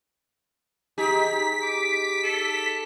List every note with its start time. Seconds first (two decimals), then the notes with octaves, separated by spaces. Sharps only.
0.98 D#4 G4 G#4 B6
1.62 D6
2.23 A4